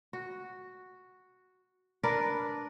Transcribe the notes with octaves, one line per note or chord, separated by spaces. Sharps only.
F#4
D4 A#4 B4 D5